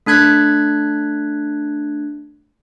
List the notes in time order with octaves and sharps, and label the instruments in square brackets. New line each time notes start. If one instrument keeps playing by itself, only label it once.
[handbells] A3 D4 F#6 G#6 B6